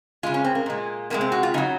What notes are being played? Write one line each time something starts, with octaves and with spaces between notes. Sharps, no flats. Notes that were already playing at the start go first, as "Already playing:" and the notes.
C#3 G#3 F4
C#4
C4
A#3
A#2 G#3
C3 F3 G#3 A#3
C4
F#4
F4
C#3 F#3 D#4